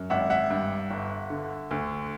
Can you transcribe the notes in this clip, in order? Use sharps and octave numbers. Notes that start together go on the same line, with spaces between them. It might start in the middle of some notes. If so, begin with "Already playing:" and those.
Already playing: F#2
G#1 E5 F#5
E5 F#5
G2
G1
D3
D2